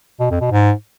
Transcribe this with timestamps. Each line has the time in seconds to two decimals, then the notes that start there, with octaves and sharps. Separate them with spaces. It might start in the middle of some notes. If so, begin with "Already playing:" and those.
0.20 B2
0.30 F2
0.41 B2
0.52 G#2